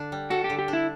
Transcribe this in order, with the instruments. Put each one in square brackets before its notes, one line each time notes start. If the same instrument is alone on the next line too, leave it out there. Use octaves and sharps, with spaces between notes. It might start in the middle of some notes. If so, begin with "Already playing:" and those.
Already playing: [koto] D3 D4
G3
[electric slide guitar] F#4 [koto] A4
[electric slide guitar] G4
[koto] D3
[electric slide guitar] G4
[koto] D4
[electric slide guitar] E4